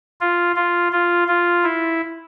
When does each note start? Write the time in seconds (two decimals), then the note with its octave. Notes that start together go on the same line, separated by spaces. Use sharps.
0.21 F4
0.56 F4
0.92 F4
1.28 F4
1.64 E4